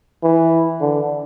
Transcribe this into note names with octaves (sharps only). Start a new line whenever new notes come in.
E3
D3